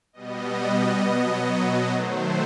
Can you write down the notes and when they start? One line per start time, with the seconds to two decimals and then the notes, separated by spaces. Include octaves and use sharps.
0.13 B2 G3 B3 D#5
1.03 B2 F#3 B3
1.91 D#3 F#3 A3 C5